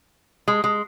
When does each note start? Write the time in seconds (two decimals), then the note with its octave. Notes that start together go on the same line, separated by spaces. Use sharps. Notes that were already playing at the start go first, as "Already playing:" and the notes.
0.48 G#3
0.64 G#3